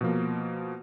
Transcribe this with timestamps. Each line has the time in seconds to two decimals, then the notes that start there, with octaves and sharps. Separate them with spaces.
0.01 B2 F3 A#3